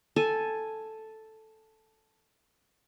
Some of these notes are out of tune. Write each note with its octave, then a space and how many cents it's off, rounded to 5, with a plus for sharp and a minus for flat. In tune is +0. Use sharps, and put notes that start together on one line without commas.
A4 +0 G#5 +0